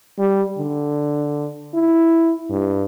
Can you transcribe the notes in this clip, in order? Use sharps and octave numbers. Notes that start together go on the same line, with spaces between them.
G3
D3
E4
G2